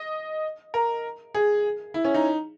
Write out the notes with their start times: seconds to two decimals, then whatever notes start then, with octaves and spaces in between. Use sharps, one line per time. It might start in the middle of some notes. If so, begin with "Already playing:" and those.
Already playing: D#5
0.74 A#4
1.35 G#4
1.94 E4
2.05 C#4
2.14 D#4